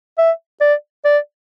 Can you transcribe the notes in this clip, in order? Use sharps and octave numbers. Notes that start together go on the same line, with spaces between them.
E5
D5
D5